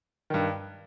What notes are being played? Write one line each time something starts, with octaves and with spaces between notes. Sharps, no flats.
G2 D#3